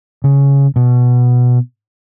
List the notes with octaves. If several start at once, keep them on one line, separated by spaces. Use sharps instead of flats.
C#3
B2